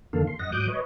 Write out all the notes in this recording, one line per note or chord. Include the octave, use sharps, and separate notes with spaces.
F2 D3 D#3 A#3 A4 F5
C6
F#2 D#5 F#5 A#6
G#2 F#3 D6 D#6 F#6 G6
B4 C#5 D#5